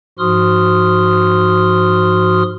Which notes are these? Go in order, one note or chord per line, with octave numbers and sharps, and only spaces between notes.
G#2 F3 F#4 C6 D#6 F6